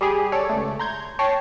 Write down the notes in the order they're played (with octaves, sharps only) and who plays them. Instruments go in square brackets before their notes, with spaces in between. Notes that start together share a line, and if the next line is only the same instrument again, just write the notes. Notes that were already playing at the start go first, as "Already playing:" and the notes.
[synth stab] G3 G4 G#4
A4 C#5 D5
C#2 A3
A#5 C6 G6 G#6
C#5 G5 A5 C#6 A#6 C7